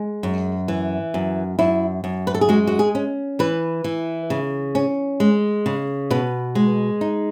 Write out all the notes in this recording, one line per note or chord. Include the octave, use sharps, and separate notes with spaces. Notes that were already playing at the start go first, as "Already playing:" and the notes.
Already playing: G#3
F#2
E3
F#2
F#2 E4
F#2
B4
A4
G#4
G#3 F#4
F#4
G#4
C#4
E3 B4
E3
C#3
C#4
G#3
C#3
B2 B4
G#3
D#4